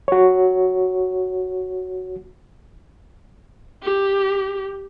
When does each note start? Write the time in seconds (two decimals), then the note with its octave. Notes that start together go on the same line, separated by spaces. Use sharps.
0.08 F#4 C#5
3.83 G4